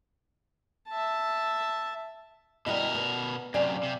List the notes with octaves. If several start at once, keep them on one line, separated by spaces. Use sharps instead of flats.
E5 A5
B2 G3 E4 A#4 D#5
B3
F#2 C3 D5 F5 G#5
C3